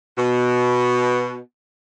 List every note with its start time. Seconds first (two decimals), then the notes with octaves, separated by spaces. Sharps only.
0.18 B2